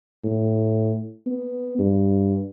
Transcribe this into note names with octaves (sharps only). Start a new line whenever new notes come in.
A2
B3
G2